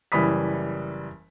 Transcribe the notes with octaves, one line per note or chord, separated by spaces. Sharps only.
F#1 E3 G3 B5 D#6 B6